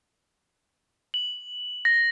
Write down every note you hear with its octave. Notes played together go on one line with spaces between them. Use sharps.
F#7
A#6